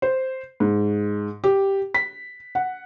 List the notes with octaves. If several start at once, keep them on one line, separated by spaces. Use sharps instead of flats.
C5
G#2
G4
B6
F#5